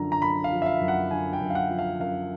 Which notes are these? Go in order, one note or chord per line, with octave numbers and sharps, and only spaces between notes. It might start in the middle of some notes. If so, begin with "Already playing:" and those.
Already playing: F#2 D3 F3 A#5
A#5
F#2 B5
F5
F3
E5
F5
F#2
F#5
D3 G#5
G5
F#2
F5
F#5
F3
F5
F#2 F5